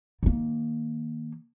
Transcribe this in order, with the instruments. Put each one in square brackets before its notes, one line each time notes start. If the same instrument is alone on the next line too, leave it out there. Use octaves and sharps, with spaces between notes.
[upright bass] D#3 A#3